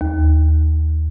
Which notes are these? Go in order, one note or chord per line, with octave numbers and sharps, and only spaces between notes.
D#2